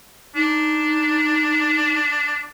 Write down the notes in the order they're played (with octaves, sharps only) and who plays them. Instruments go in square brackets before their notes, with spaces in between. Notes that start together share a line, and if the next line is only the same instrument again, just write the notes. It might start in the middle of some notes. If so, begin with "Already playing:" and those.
[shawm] D4 [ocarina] D#4